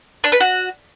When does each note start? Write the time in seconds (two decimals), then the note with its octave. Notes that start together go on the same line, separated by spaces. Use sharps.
0.24 D4
0.32 B4
0.40 F#4